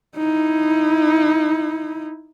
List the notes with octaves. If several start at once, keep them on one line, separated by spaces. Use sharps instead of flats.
D#4 E4